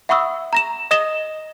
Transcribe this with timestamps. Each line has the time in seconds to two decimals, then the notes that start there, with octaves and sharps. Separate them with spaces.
0.09 E5 F#5 B5 C#6 D#6 E6
0.53 A#5 A#6 E7
0.91 D#5 D#6 A#6 E7 G7